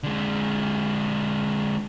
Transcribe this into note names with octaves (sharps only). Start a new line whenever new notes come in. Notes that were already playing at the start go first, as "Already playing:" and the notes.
D3 G#3